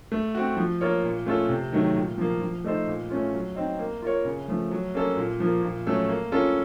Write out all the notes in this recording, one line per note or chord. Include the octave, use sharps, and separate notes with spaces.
A3
C4 F#4
F3
A#3 F4 A#4 C#5
A#2
A3 C#4 F4 A4
C3
D#3 F#3 A3
A#2
F3 A#3
F3
A3 D#4 A4 C5
A#2
A3 C#4 F4
F#3
C4 D#4
A#3
F4 A#4 C#5
C#3
F3 A3
F#3
A#3 C#4 A4
A#2
F3 A#3
A#2
F#3 A3 C#4 A4
A#3
C#4 F4 A4